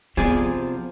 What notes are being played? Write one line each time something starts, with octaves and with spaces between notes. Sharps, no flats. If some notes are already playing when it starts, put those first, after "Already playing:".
C3 F3 B3 G#4 D5 G#5